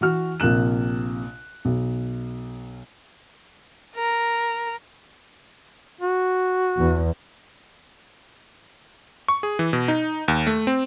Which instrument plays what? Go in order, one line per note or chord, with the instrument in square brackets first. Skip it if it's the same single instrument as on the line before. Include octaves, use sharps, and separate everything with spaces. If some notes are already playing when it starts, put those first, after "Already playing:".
[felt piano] E3 F#4 F6
A#1 C3 A#3 F#6 E7
B1
[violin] A#4
[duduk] F#4
[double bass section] E2
[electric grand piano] C#6
G#4
E3
B2
D#4
D#2
A3
C4